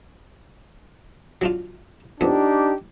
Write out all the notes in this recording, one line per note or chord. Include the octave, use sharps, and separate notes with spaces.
F#3 D4 F4
F2 B3 D4 D#4 G4